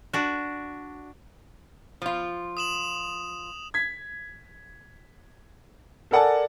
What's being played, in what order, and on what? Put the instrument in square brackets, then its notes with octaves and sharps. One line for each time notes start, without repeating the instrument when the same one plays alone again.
[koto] D4 F#4
[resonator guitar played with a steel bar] F3 F4
[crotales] D#6 E7 F#7
[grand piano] G#6 B6
A4 A#4 D5 F#5 G#5 A5